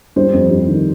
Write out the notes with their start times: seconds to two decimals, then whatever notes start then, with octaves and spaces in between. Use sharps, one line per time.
0.16 G3 C5
0.34 F2
0.51 G3
0.68 D#3